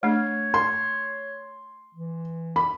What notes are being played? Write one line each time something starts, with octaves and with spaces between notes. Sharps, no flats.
A3 D4 C#5
C6
E3
B5